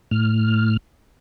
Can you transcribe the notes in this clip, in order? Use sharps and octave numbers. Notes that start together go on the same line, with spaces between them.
A2 F6